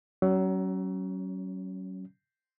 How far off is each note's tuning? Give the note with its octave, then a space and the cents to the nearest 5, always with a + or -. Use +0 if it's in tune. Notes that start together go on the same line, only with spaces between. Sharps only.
F#3 +30 C#4 +0